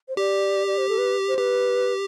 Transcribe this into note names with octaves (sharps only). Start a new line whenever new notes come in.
C5
G4 D5
D5
C5
A4
B4
C5
G4 B4